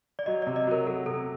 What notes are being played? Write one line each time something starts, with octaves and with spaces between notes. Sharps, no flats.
D5
F#3 D#5
C3 D5
D#5
F#3 A#4
F#3 A4
C3 A4